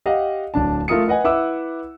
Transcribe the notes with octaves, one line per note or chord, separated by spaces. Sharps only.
G4 D#5 F5 F#5
D1 D4 A5
A3 F4 A#4 D#6 C#7
B4 D#5 F#5 G#5
E4 B4 E5 F#5 D6 E6